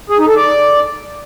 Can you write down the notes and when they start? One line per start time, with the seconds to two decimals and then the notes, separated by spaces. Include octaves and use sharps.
0.10 G#4
0.19 D#4
0.27 A4
0.36 D5